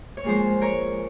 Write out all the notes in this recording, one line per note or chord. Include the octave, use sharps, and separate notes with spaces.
C#5
A#2 F3 G#3 G#4 C5
A#4 C#5